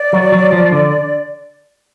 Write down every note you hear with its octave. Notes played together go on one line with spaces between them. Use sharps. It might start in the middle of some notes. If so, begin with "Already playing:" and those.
Already playing: D5
F#3
F#3
F3
D3